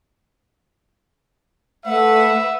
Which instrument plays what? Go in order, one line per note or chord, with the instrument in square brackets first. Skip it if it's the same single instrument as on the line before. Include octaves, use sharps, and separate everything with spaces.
[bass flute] A3 [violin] B4 F#5 [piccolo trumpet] E5